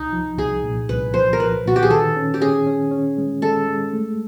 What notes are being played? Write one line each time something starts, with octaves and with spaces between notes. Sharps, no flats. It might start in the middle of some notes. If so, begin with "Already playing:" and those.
Already playing: C2 D#4
F3
C2 G#4
A#2
C2 B4
F3 C5
A#4
F3 B4
A#2 F#4
G4
G#4
D#3 A4
C#4
G4
C#4 G#4
C#4
C#4
G#3
G#3 A4
G#3
A3